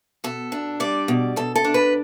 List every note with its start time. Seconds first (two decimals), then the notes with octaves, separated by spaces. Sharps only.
0.24 B2 A4
0.52 D4
0.80 G3 D5
1.08 B2
1.36 B2 A4
1.55 A4
1.64 D4
1.74 B4